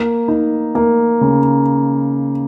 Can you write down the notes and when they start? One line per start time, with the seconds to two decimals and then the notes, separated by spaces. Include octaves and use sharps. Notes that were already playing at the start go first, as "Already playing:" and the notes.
Already playing: A#3
0.28 D#4
0.75 A#3
1.21 C#3